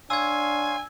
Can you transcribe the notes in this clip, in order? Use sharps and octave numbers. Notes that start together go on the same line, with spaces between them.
D4 C#5 F5 G#5 C6 E6 G#6